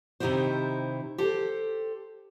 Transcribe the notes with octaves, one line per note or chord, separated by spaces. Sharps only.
C3 D#3 D#4 E4 G4 C5
G4 A4 C5